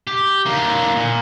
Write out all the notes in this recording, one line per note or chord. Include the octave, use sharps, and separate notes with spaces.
G4
D3 A#3
A#2